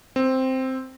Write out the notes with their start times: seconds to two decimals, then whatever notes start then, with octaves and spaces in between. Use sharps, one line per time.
0.16 C4